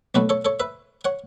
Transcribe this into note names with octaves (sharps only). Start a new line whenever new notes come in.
B1 B2 F#3 A3 F#4 B4
A4 C#5
A4 C#5
B4 E5
C#5 F#5